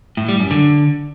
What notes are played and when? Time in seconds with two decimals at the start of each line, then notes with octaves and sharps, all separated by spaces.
0.17 A2
0.28 G3
0.40 F#2
0.51 D3